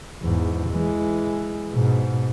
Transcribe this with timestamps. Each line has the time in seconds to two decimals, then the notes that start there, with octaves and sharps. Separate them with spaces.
0.22 E2 G#2
0.70 E3 G#3
1.72 G#2 B2